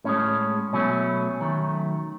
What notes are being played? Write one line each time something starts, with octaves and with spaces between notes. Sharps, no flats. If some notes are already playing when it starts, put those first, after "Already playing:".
A2 G#3 C#4
B2 F#3 A3 C#4
D#3 F#3 A3